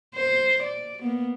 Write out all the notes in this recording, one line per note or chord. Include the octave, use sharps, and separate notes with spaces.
C5
D5
A#3 B3